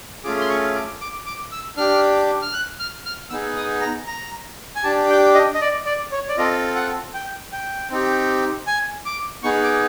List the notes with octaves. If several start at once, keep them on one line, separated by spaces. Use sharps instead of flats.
A3 C#4 F4 G#4 D6
C6
C#6
D6
D6
D6
E6
D4 G4 F6
F6
F#6
F6
F6
B3 D#4 G#4 E6
D#6
A#5
A#5
G#5
D4 G4 A5
G5
D#5
D#5
D5
D5
C#5
D5
C4 F4 A4 D#5
F#5
G5
G5
C4 D#4 G4
G#5
D6
B3 D#4 G#4 C#6
D6